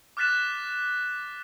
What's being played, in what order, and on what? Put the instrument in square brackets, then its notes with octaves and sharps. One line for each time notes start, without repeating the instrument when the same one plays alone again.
[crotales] D6 F6 F#6 A6 B6 E7